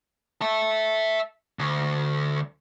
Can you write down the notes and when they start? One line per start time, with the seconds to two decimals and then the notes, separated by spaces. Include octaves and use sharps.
0.41 E5 A5
1.59 D2